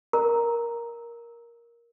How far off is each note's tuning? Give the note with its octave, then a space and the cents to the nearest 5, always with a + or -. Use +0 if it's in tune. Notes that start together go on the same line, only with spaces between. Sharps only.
A#4 +10 A#5 +0